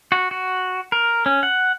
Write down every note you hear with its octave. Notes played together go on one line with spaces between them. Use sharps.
F#4
F#4
A#4
C#4
F#5